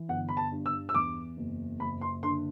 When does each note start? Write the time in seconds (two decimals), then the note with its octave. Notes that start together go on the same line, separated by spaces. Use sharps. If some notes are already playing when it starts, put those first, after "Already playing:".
Already playing: E3
0.09 G1 F#5
0.29 B5
0.37 A5
0.52 G2
0.66 E6
0.89 E6
0.94 E2 D6
1.37 F#1
1.80 F#1 B5
2.01 C6
2.23 D3 C6